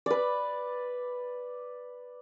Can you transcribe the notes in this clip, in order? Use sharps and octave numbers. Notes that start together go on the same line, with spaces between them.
B4 D5